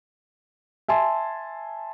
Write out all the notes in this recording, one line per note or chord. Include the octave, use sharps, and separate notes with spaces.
E5 G#5 A5 C6